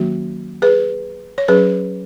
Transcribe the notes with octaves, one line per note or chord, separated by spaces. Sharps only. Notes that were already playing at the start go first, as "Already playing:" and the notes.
Already playing: D#3 F#3 A#3 C#4 F#4
G#4 B4
C#5
F#3 C#4 G#4 B4